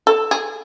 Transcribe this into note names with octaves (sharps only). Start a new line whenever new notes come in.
A4
G#4